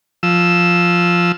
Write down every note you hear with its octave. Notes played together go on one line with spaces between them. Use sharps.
F3 E6